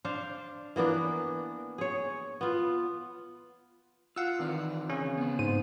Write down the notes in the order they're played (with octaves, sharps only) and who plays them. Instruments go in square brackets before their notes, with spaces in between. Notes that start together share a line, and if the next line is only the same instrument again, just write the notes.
[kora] D4 C5 F5
E3 A#3 B3 D4
G#4 C#5
B3 F4
[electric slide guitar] F4 [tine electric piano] F5 F#5 E6
[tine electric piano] D#3 [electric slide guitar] E3 C4 D5
[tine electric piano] C#3 C#4
[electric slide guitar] B3 C4
[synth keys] G#2 C5 D#7